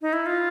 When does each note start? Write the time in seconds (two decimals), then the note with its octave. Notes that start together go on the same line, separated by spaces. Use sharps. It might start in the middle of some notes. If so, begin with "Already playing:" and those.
0.02 D#4
0.13 E4
0.26 F4